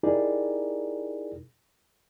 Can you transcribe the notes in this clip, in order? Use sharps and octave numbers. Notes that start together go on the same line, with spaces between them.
D#4 E4 G4 G#4 A#4 D5